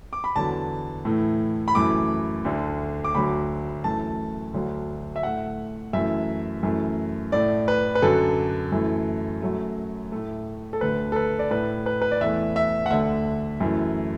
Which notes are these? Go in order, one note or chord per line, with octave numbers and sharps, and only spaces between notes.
D6
B5
E2 D3 F#3 A5
A2 E3 A3
B5
F#2 E3 A3 D6
D2 D3 A3
D6
D2 D3 F#3 B5
F#2 E3 A3 A5
D2 D3 F#3
E5
A2 A3 F#5
F#2 E3 A3 E5
F#2 E3 A3
A2 A3 D5
B4
B4
F#2 D3 F#3 A4
F#2 E3 A3
F#2 F#3 A3
A2 A3
A4
D2 D3 A3 B4
A4
B4
D5
A2 A3 B4
B4
B4
D5
E2 E3 A3 E5
E5
F#5
D2 D3 A3 E5
F#2 E3 A3